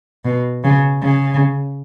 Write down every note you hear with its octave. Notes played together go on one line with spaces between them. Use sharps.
B2
C#3
C#3